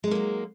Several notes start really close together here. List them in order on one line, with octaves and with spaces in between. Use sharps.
G#3 D#4 A#3 F#3